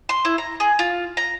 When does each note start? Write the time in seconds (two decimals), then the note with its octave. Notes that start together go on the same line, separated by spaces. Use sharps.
0.09 C6
0.25 E4
0.38 A#5
0.60 G#4
0.79 F4
1.17 A#5